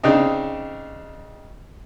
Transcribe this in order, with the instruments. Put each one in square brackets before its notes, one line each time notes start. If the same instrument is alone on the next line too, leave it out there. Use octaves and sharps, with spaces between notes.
[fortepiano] C#3 C4 D4 D#4